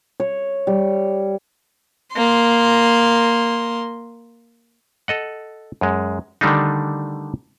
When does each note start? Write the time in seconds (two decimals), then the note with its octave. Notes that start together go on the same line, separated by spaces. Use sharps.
0.20 C#5
0.67 G3
2.14 A#3 C6
5.08 A4 D#5 F#5
5.81 F#2 G#3
6.41 D3 D#3 G3 A3 D4 D#4